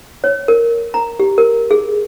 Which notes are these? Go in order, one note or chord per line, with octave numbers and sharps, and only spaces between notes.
C#5
A#4
A#5
G4
A#4
G#4